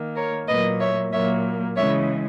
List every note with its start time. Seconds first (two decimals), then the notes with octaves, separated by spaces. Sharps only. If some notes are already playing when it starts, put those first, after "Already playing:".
Already playing: D#3 A#3
0.15 A#4 C#5
0.47 A#2 F#3 A#3 B4 D#5
0.79 C#5 E5
1.12 A#2 F#3 A#3 C#5 E5
1.76 C#3 E3 G#3 C#5 E5